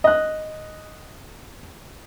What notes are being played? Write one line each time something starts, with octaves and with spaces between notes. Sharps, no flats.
D#5 F#6